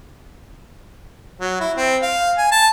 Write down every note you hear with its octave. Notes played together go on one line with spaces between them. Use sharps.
F#3
E4
C4
F5
G#5
A5